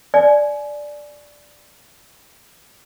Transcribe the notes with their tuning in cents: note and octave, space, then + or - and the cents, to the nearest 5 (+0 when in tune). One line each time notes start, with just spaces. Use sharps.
D5 +0 G#5 +25